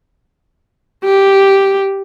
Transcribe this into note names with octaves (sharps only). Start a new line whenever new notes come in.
G4